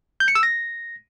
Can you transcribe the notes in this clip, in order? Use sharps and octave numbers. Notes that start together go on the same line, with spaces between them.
G6
C#7
E6
A#6